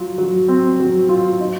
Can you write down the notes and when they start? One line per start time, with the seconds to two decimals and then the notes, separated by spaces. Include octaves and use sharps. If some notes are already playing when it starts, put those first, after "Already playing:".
Already playing: F#3 F4
0.18 F#3
0.49 C4
0.80 F#3
1.09 F4
1.40 D#4